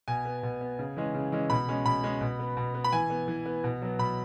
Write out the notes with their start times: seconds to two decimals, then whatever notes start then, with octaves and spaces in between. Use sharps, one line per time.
0.08 B2 G#5
0.25 B3
0.43 B2
0.61 B3
0.79 C#3
0.97 E3 G#3 C#4
1.15 C#3
1.32 E3 G#3 C#4
1.50 B2 B5
1.68 G#3 C#4
1.85 B2 B5
2.03 G#3 C#4
2.21 B2
2.39 B3
2.57 B2
2.74 B3
2.84 B5
2.93 E3 G#5
3.10 B3
3.28 E3
3.46 B3
3.64 B2
3.82 F#3 B3
3.99 B2 B5